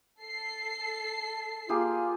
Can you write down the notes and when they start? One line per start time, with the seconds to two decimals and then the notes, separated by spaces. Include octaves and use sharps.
0.20 A4 C7
1.69 A#3 F4 G4 G#4